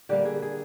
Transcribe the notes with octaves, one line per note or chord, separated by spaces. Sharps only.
D3 G3 A#3 G4
G#4
G#4